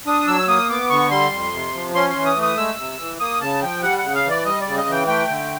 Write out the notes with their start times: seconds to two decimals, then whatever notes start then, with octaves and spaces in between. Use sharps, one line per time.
0.06 D4 D#6
0.28 F#3 E6
0.48 A#3 D#6
0.70 B3 D6
0.90 D3 C#6
1.11 G3 C6
1.32 F2
1.53 C3
1.74 F3
1.95 C#4 C6
2.10 C6
2.15 E3
2.25 D#6
2.36 A3
2.42 D#6
2.57 G#3 E6
2.78 C3
2.99 E3
3.20 A#3 D#6
3.41 C#3 A5
3.62 F3 G5
3.82 G3 F#5
3.98 F#5
4.03 C#3
4.14 F5
4.25 E3 D5
4.45 G3 D#5
4.61 C#3 D5
4.77 D#5
4.87 E3
4.92 G5
5.08 A3 G5
5.29 D3